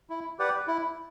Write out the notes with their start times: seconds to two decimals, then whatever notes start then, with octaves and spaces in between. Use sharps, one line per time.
0.10 E4
0.39 G4 B4 D5 F#5
0.68 E4